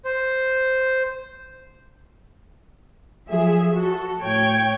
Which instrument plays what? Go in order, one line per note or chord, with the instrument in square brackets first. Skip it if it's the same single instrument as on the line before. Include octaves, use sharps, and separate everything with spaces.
[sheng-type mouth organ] C5
[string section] F3 F#3 G#4 E5
F#4 A4
A2 C#5 G5 G#6